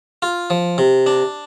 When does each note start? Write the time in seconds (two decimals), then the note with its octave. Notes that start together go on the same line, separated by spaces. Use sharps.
0.22 F4
0.50 F3
0.78 C3
1.06 D4